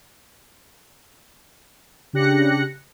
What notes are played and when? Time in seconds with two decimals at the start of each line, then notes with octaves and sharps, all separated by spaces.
2.13 C#3 D4 G4 F#6 A#6 C#7